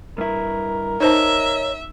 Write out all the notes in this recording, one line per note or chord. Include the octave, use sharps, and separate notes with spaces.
G2 E4 A#4
D#4 C5 C#5 D#5 E5 A5